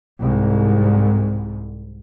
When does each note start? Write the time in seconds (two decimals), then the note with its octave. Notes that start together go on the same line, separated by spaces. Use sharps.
0.19 C2 G#2